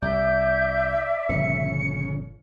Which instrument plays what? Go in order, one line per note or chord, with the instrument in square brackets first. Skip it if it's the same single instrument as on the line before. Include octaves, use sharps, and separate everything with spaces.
[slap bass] C2 [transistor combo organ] D5 [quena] E5 [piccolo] G6
[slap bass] G1 A#2 F3 [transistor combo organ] C#3 [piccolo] C#7